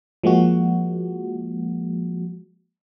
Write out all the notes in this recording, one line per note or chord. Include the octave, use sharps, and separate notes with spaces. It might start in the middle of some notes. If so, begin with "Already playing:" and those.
F3 G#3 A#3 F#4